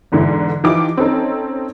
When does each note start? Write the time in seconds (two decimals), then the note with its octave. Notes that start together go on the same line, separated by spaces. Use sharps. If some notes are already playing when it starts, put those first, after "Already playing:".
0.12 E2 G#2 D3 E3
0.64 E3 F3 D#4 F4 G4 D6
0.97 C4 C#4 D#4 A4 A#5